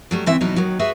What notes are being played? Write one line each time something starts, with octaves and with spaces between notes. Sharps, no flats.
F#3 G3 A3
C#3 E3 C4 E4 E5
E2 B2 F#3 D#4 E4
D#2 D#3 F#3
F#4 G#4 B4 E5